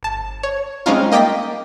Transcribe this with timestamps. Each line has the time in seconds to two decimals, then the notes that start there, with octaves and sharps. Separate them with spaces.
0.03 G1 A5
0.43 C#5
0.86 G3 G#3 C4 C#4 D#4 F4
1.12 A#3 D#5 G5 D6 A6 B6